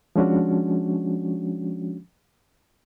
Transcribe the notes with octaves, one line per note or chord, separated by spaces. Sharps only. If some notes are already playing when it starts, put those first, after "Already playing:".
F3 G#3 C#4 D4 F#4